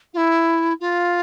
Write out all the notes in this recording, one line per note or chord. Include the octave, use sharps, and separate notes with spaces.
F4
E4
F4